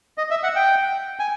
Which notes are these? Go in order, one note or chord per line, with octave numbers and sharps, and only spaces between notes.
D#5
E5
F#5
G5
G#5